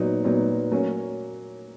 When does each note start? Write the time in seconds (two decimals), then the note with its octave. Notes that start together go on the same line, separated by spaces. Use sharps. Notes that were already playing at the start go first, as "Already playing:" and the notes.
Already playing: A#2 F#3 B3 D#4
0.24 A#2 F#3 B3 D#4
0.72 F#3 A#3 C#4